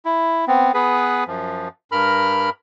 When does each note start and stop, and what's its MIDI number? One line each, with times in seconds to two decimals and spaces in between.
0.05 0.45 64
0.48 0.72 59
0.48 0.72 60
0.74 1.24 59
0.74 1.24 68
0.74 1.24 71
1.27 1.68 42
1.27 1.68 53
1.92 2.50 43
1.92 2.50 70
1.92 2.50 83
1.92 2.50 89